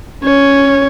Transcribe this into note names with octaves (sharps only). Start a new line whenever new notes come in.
C#4 C#5